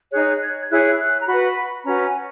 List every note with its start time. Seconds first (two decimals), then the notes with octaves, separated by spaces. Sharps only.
0.13 D#4 G#4 C#5 F#6
0.42 G#6
0.70 E4 G#4 C#5 F#6
0.99 F#6
1.21 A#5
1.27 F#4 B4 B5
1.85 C#4 F#4 B4 A#5
2.03 G#5